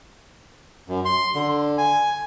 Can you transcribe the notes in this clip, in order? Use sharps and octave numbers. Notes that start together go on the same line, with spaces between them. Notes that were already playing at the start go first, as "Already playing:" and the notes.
F#2
C6
D3
G#5